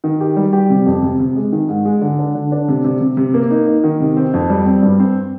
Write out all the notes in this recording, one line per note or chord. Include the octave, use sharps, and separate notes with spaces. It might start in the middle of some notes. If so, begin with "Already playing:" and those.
D#3
G4
G3
G4
C3
F2
C3
C3
G#3
D#3
G#2
G#3
D3
D4
D3
D4
C3
C3
C3
C3
A#3
D#4
D#4
D#3
C3
C4
F2
G3
C4
G2
C4